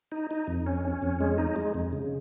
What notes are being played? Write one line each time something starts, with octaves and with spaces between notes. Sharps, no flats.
D#4
D#4
F2
C#4
C#4
F2
G#3
D#4
G#3
F2
C#3